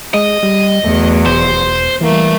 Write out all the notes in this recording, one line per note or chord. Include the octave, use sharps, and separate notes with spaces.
G#3 D#5
G3
E2 F#3 A3
E1 C5
E3 G3 A3 A#3